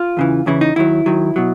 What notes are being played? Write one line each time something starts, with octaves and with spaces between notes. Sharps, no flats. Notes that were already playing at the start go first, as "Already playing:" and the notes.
Already playing: F4
E2 C#3 E3
E2 C#3 E3 E4
D#4
D#2 D#3 F#3 E4
D#2 D#3 F#3
B2 F#3